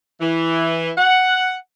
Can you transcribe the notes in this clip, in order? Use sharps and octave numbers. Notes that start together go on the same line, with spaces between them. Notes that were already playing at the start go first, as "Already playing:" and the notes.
E3
F#5